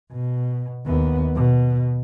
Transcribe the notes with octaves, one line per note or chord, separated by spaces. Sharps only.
B2
D#2 B3
B2